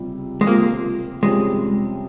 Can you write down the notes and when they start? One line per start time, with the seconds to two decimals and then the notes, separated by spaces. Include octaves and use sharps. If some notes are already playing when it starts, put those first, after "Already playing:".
Already playing: C#2 C3 G3
0.41 G#3
0.47 C#2 C3 F3 A#3 C4
1.23 F2 C3 G3 G#3 C#4